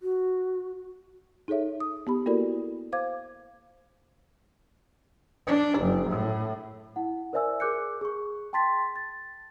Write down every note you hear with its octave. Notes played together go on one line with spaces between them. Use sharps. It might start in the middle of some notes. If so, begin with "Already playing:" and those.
F#4
D#4 G#4 A4 C#5 E5
D#6
B3 G4 B5
A#3 E4 F#4 A4 A#4 D5
C5 F5 D6 G#6
D4
F#1
A2
E4 F#5
A#4 C5 D5 E5 G#5 E6
G#4 A#4 D6 F#6 G6 C#7
G#4 C#6
G5 A5 C6 A6 B6
A6